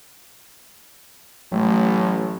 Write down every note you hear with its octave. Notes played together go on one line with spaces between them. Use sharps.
A1 A2 F#3